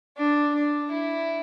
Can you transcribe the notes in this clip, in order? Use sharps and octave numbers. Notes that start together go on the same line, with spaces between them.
D4
D4
E4